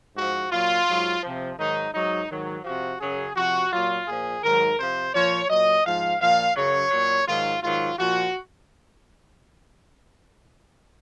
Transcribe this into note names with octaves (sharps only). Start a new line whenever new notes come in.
G#2 F3 F#4
A#2 F#3 F4
G#2 F#3
C3 F3
G#2 D#3 F#3 D#4
G#2 F#3 D#4
G#2 D#3 F#3
C3 F3 F#4
F#2 C#3 F#3 G#4
C3 F3 F#4
A#2 F#3 F4
A#2 F3 G#4
G#2 D#3 F#3 A#4
C3 F3 C5
A#2 F3 C#5
A#2 F#3 D#5
G#2 F3 F5
A#2 F3 F5
F#2 C#3 F#3 C#5
A#2 F#3
G#2 D#3 F#3 F4
G#2 D#3 F#3 F4
A#2 F3 F#4